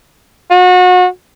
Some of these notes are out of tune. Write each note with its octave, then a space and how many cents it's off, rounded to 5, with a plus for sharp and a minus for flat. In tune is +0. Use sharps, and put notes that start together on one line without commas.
F#4 -30